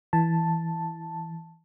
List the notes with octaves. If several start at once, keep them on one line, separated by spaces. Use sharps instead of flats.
E3 A5